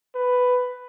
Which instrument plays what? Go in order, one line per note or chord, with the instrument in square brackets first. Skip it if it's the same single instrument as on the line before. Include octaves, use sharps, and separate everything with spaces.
[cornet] B4